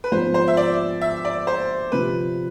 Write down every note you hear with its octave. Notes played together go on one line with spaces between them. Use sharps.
B4
G#1 G#2 F3 G#3 B3 C5
C5
E5
D5
E5
D5
C5
C3 F3 B4